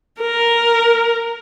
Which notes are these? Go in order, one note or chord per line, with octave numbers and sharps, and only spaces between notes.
A#4